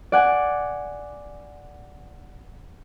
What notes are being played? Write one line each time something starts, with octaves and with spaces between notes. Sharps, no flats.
D5 F#5 G#5